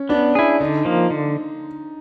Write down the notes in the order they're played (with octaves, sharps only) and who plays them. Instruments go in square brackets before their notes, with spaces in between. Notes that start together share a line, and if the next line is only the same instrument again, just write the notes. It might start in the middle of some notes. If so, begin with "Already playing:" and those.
Already playing: [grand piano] C#4
[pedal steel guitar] B3 [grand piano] D4
[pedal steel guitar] E4 G#4
[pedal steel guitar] D3 [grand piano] D#4
[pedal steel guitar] F3 A#3
D3